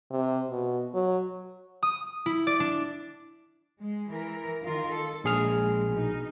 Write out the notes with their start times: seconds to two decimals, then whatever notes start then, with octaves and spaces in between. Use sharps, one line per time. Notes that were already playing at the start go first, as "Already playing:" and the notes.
0.11 C3
0.51 B2
0.94 F#3
1.83 D#6
2.26 E4
2.47 D5
2.60 D4
3.81 G#3
4.10 E3 A#4
4.61 D#3 F4 A#4
4.90 A4
5.24 A#1 G#3 G#4 F6
5.94 B2 D#4